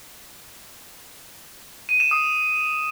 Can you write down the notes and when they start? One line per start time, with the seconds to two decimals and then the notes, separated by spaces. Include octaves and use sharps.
1.89 D#7
2.00 E7
2.11 D#6